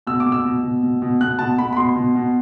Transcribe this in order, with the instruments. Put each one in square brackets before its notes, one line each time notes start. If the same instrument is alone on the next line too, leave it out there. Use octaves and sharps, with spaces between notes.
[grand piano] B2 E6
D6
B2
E6
B2
B2
B2
B2
B2 F#6
B2 A5
B2 B5
B5
B2 C6
B2
B2